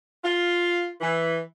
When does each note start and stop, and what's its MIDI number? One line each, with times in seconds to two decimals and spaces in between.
0.24 0.90 65
1.01 1.39 52